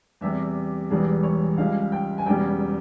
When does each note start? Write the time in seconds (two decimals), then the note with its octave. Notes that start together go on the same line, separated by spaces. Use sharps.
0.21 E2 C3 G3 E5
0.90 E1 E2 E3 G3 G#4
1.23 C#5
1.57 C#2 C#3 G3 F5
1.92 G5
2.18 G#5
2.26 E1 E2 C#3 G3 G5